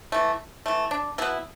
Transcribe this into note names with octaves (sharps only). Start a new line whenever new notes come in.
E3 A3
E3 A3
D4
B2 B3 E4